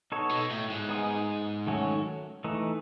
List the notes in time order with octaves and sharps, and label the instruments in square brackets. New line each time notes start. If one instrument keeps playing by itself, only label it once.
[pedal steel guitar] B3 D#4 A4 C#5
[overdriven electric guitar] B2
A2
G#2
[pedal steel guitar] B3 D#4 G#4
D#3 F#3 A3 C#4 F#4
E3 A3 D#4